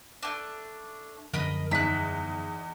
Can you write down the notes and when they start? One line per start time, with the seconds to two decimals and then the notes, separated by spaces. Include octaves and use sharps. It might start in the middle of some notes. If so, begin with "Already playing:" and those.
0.23 A3 D4
1.33 F#2 D3 F3 A#4 D#5 B5
1.71 E2 D#4 E5 F#6 B6